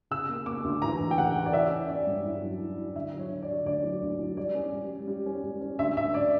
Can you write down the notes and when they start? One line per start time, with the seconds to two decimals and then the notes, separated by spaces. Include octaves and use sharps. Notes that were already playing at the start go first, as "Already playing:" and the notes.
0.11 C#3 E6
0.29 A#3
0.46 A#3 D6
0.64 D2
0.82 E3 A#5
1.00 D2
1.11 G5
1.18 C#3 F#5
1.35 E3
1.46 D5
1.53 C#4 E5
1.71 C#4
1.89 C#4 D5
2.07 G2
2.24 E4
2.42 F#3
2.60 E4
2.78 E4
2.95 D3 E5
3.13 F#3
3.19 C#5
3.30 D3
3.42 D5
3.49 D3
3.66 D2 D5
3.83 F#3
4.02 D2
4.19 F#3
4.37 G3 D5
4.55 C#4
4.73 G3
4.90 G3
5.08 G3
5.26 C#4
5.43 G3
5.61 C#4
5.79 D2 E5
5.97 D2 E5
6.14 D5